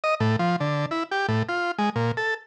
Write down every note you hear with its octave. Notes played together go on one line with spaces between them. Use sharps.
D#5
A2
F3
D3
E4
G4
A2
F4
G#3
A#2
A4